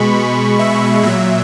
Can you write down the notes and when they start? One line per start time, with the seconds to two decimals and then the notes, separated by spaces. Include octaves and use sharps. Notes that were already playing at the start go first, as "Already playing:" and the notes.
Already playing: B2 G#3 B5 C#6
0.15 B5
0.59 E5
1.03 A#2 F#3 E5